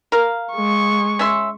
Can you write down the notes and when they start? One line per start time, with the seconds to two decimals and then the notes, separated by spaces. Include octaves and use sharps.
0.12 A#4 F5
0.54 G#3 C#6
1.19 C#4 E5 C6